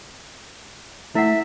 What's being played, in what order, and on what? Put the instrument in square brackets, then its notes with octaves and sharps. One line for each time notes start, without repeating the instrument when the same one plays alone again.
[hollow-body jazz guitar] A3 [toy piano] E4 F#5 [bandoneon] E5